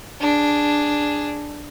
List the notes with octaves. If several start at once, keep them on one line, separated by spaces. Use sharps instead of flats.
D4 G#4